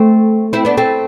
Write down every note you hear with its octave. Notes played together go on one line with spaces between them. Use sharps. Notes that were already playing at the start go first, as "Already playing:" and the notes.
Already playing: A3 C4
C4 E4
B3 D4
A3 C4